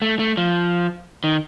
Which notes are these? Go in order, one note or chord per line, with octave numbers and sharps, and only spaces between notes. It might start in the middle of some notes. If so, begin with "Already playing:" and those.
A3
A3
F3
D#3